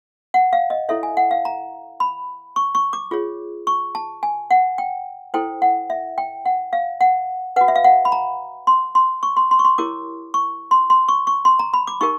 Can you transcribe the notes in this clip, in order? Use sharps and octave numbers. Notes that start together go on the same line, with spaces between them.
F#5
F5
D#5
E4 A4 C#5 E5
G#5
F#5
F5
A#5
B5
C#6
C#6
D6
F4 G#4 C#5
C#6
A5
G#5
F#5
G5
E4 A4 C5 G5
F#5
E5
G5
F#5
F5
F#5
F#4 B4 F#5
E5
F5
F#5
B5
A#5
C6
C6
C#6
C6
C6
C#6
C6
E4 G4 A#4 C#5 D6
C#6
C6
C6
C#6
C#6
C6
A#5
B5
D6
D#4 G4 A#4 C#6